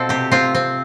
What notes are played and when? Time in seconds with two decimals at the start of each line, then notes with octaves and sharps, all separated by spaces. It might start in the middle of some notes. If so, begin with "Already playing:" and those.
Already playing: B2 C4 F4 A4
0.09 C3 G4
0.32 C4 F4
0.55 C4